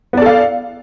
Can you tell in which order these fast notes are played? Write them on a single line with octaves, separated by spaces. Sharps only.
B3 D5 A4 F5